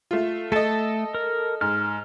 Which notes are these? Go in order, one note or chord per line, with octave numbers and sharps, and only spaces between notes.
A3 F4
A3 A4 D#5 A5
A#4
G#2 F6